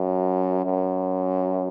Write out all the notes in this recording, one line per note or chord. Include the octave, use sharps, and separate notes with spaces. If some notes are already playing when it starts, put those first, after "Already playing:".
Already playing: F#2
F#2